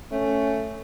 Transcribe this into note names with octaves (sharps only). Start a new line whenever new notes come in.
A3 C#4